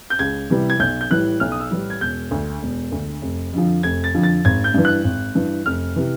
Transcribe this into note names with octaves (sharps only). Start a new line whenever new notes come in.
G6
C#2 G#6
C3 E3 G3
G#6
B1 G6
G6
A2 E3 G3 F#6
B1 F6
D#6
E6
A2 E3 G3
G#6
E1 G6
D2 D3
E1
D2 D3
F1
F2 D3 F3
F1 G#6
A6
F2 D3 F3
A6
G#1 G#6
G6
G2 E3
F#6
G#1
G2 E3
F1 F6
C3 E3